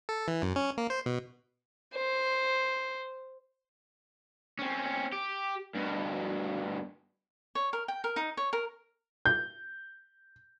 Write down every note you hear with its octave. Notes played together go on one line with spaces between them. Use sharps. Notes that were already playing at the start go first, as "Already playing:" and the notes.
A4
E3
F#2
C#4
A#3
C5
B2
C5
C4 C#4
G4
G2 B2
C#5
A#4
G5
A#4
D#4
C#5
A#4
G6